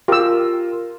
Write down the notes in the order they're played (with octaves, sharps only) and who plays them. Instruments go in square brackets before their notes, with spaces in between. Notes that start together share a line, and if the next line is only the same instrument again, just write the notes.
[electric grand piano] F4 A#4 [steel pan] G4 E6